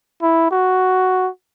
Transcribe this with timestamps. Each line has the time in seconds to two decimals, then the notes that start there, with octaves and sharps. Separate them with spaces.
0.22 E4
0.51 F#4